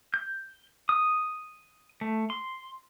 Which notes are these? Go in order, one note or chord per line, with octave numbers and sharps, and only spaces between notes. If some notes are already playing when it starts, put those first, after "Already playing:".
G6
D#6
A3
C6